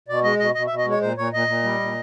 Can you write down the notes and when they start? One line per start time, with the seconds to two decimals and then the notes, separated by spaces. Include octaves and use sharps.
0.08 B2 D5
0.23 G#3 D#5
0.39 B2 D#5
0.55 B2 D#5
0.67 E5
0.70 B2
0.78 D#5
0.85 G#3
0.90 C#5
1.01 A#2 C5
1.17 A#2 C#5
1.33 A#2 D#5
1.48 A#2
1.63 G3
1.79 A#2